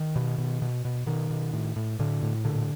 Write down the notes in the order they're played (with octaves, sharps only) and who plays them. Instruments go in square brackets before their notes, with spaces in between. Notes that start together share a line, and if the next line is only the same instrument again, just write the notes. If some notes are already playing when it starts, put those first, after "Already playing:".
Already playing: [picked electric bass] D#3
B2
B2
B2
B2
B2 D#3
B2
A2
A2
A2 D3
A2
A#2 D3